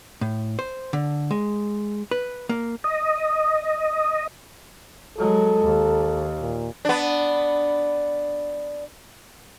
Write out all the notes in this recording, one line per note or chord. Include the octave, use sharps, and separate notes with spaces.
A2
C5
D3
G#3
B4
A#3
D#5
F#3 G#3 A4
D#2
A#2
B3 D4